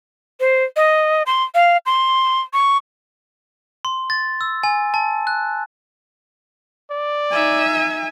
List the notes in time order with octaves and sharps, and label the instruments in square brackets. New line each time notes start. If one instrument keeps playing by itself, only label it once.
[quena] C5
D#5
C6
F5
C6
C#6
[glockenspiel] C6
A6
E6
G#5
A5
F#6
[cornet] D5
[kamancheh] D#4 E5 [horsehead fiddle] G#5